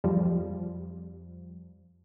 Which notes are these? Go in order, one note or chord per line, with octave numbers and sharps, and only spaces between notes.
F2 F3 G3